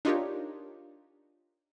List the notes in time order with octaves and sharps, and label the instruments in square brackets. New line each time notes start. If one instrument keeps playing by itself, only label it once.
[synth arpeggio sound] D4 D#4 F4 G4 A#4 C#5